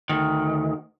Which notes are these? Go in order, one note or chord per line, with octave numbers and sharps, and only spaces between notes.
D2 D#3